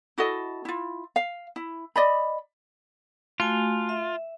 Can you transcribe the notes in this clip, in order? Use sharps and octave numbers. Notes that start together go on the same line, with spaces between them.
E4 F#4 A4 D#5
E4 F4
F5
E4
D5 D#5 B5
A3 F4 F#4 G#5
E5